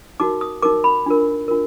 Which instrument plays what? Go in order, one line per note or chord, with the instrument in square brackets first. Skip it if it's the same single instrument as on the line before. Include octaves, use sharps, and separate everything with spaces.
[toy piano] D#4 F#4 A#4 D6
D#6
D#4 F#4 A#4 D6
B5
D4 F4 A#4
D4 F4 A#4